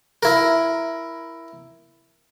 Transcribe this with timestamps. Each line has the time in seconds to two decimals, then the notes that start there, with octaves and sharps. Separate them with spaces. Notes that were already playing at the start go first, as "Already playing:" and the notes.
0.23 E4 A#4